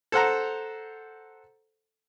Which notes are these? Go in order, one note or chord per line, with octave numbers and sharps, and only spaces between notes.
A4 C5 F#5 A#5